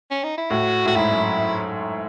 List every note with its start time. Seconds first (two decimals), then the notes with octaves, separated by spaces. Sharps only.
0.11 C#4
0.24 D#4
0.38 E4
0.50 A2 F#4
0.85 A2 F#4
0.96 G#2 E4
1.11 F#2